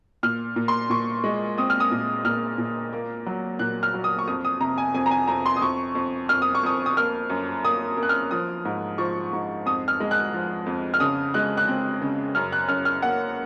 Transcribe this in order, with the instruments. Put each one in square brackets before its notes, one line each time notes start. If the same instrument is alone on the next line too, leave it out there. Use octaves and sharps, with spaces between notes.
[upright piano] A#2 F6
A#2
C6
A#2 C#6
G#3
C4 D#6
F6
D#6
A#2
A#2 F6
A#2
A#3
F#3
A#2 F#6
F6
F#3
D#6
C#6
F2 D#6
D#6
C3 A#5
G#5
F2 G#5
A#5
G#5
F2 A#5
C6
D#6
F2 C#6
F2
F2 F6
D#6
C#6
F2 D#6
D#6
A#3 F6
F#2
A#3 D#6
A#3
F#6
F6
F3 D#6
G#2
F3 C#6
G#2
F2 D#6
F6
G#3
F#6
F3
F2
F6
C#3 D#6
G#3 F#6
F#6
C4
C#3
F#2 F6
F#6
F#2 F6
F6
A#3 F#5